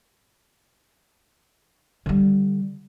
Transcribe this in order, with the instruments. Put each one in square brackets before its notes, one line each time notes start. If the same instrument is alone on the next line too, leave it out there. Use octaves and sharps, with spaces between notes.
[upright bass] D3 G3